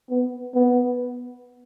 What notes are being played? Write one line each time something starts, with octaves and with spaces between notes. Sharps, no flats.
B3
B3